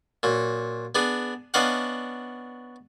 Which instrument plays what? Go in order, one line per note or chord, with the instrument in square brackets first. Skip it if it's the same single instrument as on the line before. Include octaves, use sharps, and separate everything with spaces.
[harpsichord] A#2 F#3
B3 D4 G#4
B3 C#4 D4 D#5 F5 F#5